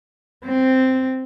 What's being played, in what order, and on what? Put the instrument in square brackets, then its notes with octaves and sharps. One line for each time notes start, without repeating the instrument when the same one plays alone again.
[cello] C4